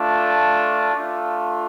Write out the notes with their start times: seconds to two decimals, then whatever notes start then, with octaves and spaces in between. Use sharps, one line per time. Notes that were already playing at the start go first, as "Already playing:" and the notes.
Already playing: A3 D4 F4
0.93 A3 D4 F4